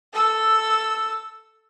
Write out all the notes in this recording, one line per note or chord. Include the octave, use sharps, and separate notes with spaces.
A4 E6